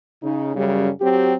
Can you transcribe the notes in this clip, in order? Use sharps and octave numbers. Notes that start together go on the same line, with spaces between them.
C#3 D#4
F#2 C#3 G3
F#3 C4 G4